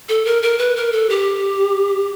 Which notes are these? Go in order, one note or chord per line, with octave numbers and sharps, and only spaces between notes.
A4
A#4
A#4
B4
A#4
A4
G4